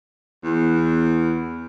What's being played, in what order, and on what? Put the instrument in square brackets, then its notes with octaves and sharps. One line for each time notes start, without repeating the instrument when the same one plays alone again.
[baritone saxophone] E2